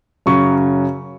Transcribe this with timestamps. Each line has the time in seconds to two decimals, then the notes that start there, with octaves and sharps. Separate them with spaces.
0.26 F#2 C#3 F#3 C#6